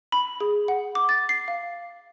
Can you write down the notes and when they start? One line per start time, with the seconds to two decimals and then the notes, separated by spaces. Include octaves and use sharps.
0.12 B5
0.40 G#4
0.68 F#5
0.95 D6
1.09 A6
1.29 C7
1.48 F5